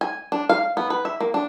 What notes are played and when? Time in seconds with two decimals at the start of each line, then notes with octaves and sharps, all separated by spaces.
0.01 G#5
0.32 D4
0.49 F5
0.77 B3
0.90 B4
1.05 E5
1.20 A#3
1.34 D4